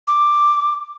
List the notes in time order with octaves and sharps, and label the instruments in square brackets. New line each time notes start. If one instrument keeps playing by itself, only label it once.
[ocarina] D6